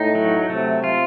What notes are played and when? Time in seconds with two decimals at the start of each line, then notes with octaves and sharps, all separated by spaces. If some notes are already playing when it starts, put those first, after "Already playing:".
Already playing: A2 D#4
0.15 F#3
0.50 C3 A3
0.84 F4